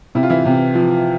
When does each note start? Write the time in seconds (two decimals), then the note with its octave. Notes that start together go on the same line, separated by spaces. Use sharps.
0.15 C3 E4
0.23 F4
0.30 E3 E4
0.45 C3
0.75 F3